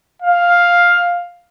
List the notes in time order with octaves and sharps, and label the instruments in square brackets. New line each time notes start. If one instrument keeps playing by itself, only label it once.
[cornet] F5